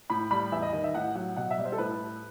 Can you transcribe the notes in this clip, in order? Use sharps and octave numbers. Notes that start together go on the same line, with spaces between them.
A2 B5
G3 B5
E2 E5
D#5
D#3 D#5
E5
A2 F#5
F#3 F#5
B2 F#5
E5
G3
C5
A4
A2 B4